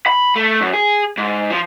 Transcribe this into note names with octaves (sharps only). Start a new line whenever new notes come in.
B5
A3
F#2
G#4
G#2
F3